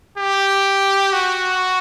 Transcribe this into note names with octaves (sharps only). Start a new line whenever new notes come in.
G4
F#4